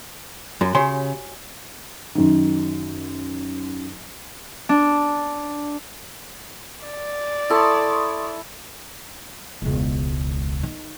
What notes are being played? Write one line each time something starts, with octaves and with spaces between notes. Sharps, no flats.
F#2 F#4
C#3 G4 C#5 G#5 C6
F#2 D#3
D4
D5
E4 A4 C6 C#6 D#6
E1 C#2
D#3